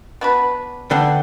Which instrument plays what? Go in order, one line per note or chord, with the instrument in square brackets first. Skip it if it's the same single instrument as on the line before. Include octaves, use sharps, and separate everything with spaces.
[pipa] B3 D4 F#4 B4
[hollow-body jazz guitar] D3 [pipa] G3 B3 D4 G4